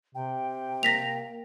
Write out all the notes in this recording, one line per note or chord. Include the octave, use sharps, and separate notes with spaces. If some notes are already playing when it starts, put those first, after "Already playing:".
C3 G5
A#3 A#6 B6 F7